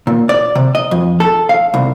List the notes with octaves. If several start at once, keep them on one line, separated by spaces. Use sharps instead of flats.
A#2
D5
C3
D#5
F2
A4
F5
C2